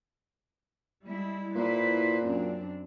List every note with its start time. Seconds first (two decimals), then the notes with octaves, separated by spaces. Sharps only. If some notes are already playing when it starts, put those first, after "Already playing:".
1.06 G3 G#3 E4
1.55 A#2 E4 B4 C5
2.23 F#2 C4 D4